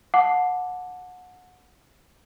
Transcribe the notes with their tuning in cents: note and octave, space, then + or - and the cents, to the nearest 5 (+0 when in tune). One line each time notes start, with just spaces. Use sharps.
F#5 -25 A5 +0 D6 +0